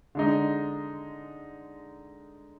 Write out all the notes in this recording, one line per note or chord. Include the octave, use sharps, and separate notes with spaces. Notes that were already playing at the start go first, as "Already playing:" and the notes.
D3 G#3 D#4